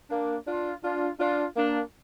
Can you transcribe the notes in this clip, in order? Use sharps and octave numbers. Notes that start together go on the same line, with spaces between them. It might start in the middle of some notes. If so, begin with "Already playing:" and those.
A#3 D4
D4 F4
D4 F4
D4 F4
A#3 D4